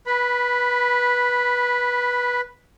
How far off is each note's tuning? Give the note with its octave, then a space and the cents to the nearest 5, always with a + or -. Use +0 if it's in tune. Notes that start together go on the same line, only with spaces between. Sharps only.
B4 -15 B5 +0